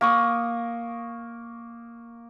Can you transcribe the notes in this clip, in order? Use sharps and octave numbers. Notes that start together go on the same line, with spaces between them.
A#3 C#6 D#6